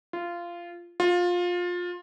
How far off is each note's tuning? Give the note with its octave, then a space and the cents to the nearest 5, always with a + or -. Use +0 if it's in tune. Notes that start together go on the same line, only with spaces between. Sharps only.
F4 -15
F4 +20